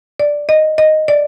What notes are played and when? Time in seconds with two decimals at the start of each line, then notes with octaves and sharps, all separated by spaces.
0.20 D5
0.49 D#5
0.78 D#5
1.08 D5